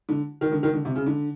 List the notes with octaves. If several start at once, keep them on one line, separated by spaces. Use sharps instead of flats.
D3
D#3
D3
D#3
D3
C3
C#3
D3